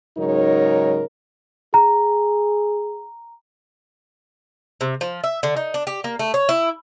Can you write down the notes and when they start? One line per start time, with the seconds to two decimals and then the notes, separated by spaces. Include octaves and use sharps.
0.18 G#2 C#3 F#3 D#4 A#4 C#5
1.74 G#4 A#5
4.81 C3
5.01 F3
5.24 E5
5.43 D3
5.56 D#4
5.74 D4
5.87 G4
6.04 A#3
6.19 A3
6.34 C#5
6.49 E4